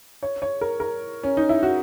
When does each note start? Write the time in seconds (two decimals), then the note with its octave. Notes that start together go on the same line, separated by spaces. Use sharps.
0.23 C#5
0.42 C#5
0.61 A#4
0.80 A#4
1.23 C#4
1.37 D#4
1.49 E4
1.63 F#4